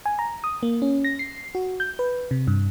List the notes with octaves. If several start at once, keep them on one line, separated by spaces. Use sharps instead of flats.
G#5
A#5
D#6
A#3
C#4
A#6
C7
F#4
G6
B4
C3
G2